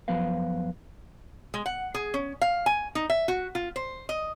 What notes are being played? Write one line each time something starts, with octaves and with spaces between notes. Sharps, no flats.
F#2 F3 F#3 B3 B4 F5
G#3
F#5
G#4
C#4
F5
G#5
D#4
E5
F#4
F4
C5
D#5